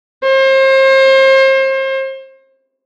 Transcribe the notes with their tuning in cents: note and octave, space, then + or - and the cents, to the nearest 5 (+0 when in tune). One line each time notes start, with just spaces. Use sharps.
C5 +35